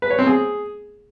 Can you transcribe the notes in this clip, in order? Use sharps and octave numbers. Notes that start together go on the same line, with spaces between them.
B4
C#5
C4
G#4